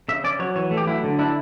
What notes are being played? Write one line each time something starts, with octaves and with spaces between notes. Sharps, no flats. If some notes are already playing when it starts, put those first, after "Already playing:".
C#3 E5
C#4 D5
F#3 C#5
E3 C#5
A3
G4
F#3 E4
D3
D4 E4